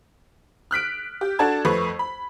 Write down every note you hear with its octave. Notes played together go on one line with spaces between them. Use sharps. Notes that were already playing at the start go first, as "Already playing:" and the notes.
F6 F#6 B6 D7
G4
D4 F#4 A4 A5 G#6
F2 A3 B4 C#6
B5